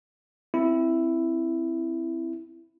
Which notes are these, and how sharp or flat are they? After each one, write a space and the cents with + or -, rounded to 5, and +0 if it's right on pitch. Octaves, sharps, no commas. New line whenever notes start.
C4 +0 E4 +5